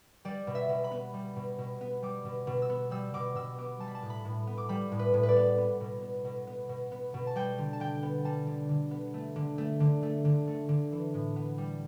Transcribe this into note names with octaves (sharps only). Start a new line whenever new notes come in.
G3 D5
B2
E5
B2
B5
B3
G3
B2
B2
B3
G3 D6
B2
B2
E6
B3
G3 E6
B2 D6
B2 E6
B3 D6
G3 A5
B5
A5
A2
B5
A2
B3
D6
G3 B5
A2
B4
A2
B4
D5
B3
B3
B2
B3
B2
B3
B2
B3
B2
A5
G3 G5
D3
A5
D3 G5
B3
G3 A5
D3
D3
B3
A3
D3
A3
D3
A3
D3
A3
D3
E3
A2
B3
G3